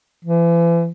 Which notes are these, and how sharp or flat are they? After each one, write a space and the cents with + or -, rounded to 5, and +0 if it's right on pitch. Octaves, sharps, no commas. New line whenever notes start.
E3 +40